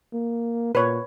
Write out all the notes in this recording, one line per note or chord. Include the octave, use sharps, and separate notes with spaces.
A#3
A#2 B4 C#5